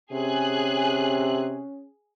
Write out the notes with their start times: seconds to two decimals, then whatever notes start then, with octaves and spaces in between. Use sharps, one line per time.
0.13 C3 C#4 G#4 F#6